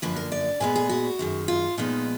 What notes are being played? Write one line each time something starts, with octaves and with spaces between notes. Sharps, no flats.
F#2 D3 F3 A#3 B4
A#4
D5
A#2 G#3 B3 B4
G#4
F#4
F#2 D#3 G#3
F4
A#2 F3 G#3 B3 D#4